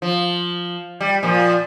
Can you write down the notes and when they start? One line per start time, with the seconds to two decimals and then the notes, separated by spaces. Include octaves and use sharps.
0.02 F3
1.00 G3
1.23 A#2 F3